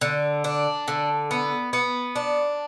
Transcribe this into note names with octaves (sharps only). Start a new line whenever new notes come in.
D3
D4
D3
B3
B3
D4